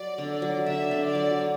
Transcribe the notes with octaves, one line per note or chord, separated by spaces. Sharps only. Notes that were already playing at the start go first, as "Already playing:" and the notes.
Already playing: F#3 D5
D3
D5
F#3
D3 E5
D3
D5
F#3
D3